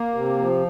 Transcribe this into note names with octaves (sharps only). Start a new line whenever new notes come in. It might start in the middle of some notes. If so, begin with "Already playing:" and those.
Already playing: A#3
C3
F3